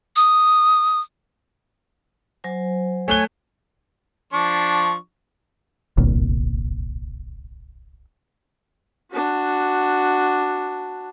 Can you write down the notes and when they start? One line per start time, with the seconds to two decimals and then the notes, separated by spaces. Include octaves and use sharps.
0.16 D#6
2.44 F#3 C5 G#5
3.08 A3 C#5 G#5 F#6 G7
4.33 F3 D4 C#6
5.98 D1 G1 C2 A#2
9.12 D4 F#4